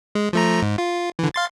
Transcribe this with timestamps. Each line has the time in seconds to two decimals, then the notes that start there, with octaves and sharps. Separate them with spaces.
0.15 G#3
0.33 F3 A3 A#5
0.63 G#2
0.78 F4
1.19 D3 E3
1.34 F5 C6 A6